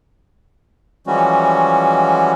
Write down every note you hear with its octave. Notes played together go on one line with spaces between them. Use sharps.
E3 F3 G3 G#3 C#4 F#4